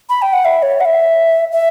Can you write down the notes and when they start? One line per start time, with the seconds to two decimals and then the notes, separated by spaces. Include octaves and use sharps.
0.09 B5
0.22 G5
0.33 F#5
0.45 E5
0.62 C#5
0.81 F#5
0.85 E5
1.52 E5